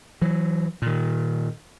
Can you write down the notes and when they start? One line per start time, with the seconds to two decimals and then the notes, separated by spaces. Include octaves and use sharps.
0.22 E3 F#3
0.82 A#2 D#3